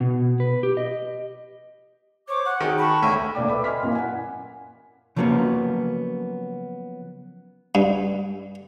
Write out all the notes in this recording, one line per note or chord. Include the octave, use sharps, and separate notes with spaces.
B2
B4
G4
D#5
C5 C#5 D6
F#5
D#3 F#4 G#4
A5 B5 C#6
D2 C#5
D2 A#2 A4 D5 G5 D6
B4 E5 B5 D6
D#5 G#5 B5 C6 F6 B6
F#2 A#2 E3 A#3
F#5 G#5
C#3 F3 F#3 A#3 B3 C#4
G2